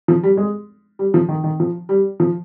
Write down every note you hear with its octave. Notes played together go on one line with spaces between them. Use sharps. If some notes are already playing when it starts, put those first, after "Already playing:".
F3
G3
G#3
G3
F3
D#3
D#3
F3
G3
F3